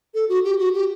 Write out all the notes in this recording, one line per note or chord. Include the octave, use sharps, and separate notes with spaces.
A4
F#4
G4
F#4
G4